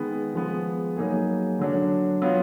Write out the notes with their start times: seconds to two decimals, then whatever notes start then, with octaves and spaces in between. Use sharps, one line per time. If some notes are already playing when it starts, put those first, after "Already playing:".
Already playing: D#3 G#3 B3
0.34 F3 G#3 B3
0.97 F#3 A#3 D#4 G#4
1.59 D3 F#3 D4
2.22 F#3 B3 F4